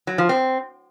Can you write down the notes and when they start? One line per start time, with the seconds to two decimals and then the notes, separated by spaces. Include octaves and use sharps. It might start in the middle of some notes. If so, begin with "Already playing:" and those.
0.07 F#3
0.18 F3
0.29 C4